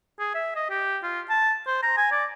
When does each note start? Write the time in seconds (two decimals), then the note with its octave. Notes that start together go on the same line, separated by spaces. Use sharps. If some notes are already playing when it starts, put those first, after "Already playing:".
0.19 G#4
0.34 E5
0.55 D#5
0.70 G4
1.03 F4
1.29 A5
1.67 C5
1.83 A#5
1.97 G#5
2.12 D5